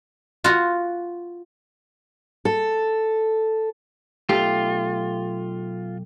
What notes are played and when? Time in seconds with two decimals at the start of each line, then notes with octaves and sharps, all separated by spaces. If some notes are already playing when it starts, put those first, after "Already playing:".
0.44 F4 F#4
2.45 A4
4.29 B1 A3 F4 G4